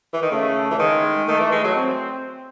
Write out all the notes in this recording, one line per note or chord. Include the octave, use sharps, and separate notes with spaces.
E3
D#3
C#3 A3
E3
D#3 G#3
D#3 A3
E3
G#3
F#3
C4